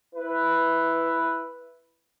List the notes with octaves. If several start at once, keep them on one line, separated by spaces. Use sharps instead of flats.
E4 B4